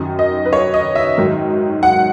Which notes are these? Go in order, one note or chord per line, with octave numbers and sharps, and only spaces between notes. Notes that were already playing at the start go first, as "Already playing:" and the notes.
Already playing: F#2 D#3 F#3
D#5
B4
C#5
D#5
E5
G#2 D#3 F#3
F#5